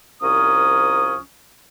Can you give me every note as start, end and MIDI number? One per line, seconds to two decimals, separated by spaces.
0.21 1.16 36
0.21 1.16 53
0.21 1.16 61
0.21 1.16 70
0.21 1.16 87